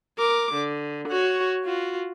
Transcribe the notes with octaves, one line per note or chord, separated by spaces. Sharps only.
A#4 D6
D3
F#4 C#5
F4 F#4